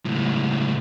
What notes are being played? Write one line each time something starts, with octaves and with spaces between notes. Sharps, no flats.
C#2 A2